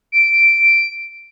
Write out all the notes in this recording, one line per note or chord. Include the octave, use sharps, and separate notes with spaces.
D7